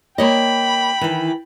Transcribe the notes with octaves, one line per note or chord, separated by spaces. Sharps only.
A#3 C#5 D#5 G5 B5
D#3 E3